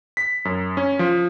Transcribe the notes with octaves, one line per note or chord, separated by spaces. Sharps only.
B6
F#2
C#4
F3